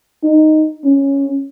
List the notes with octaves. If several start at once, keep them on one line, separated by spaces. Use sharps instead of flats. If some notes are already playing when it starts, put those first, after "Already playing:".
D#4
C#4